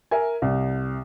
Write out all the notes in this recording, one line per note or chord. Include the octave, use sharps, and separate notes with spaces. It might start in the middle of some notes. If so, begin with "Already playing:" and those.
A#4 E5 G#5
C2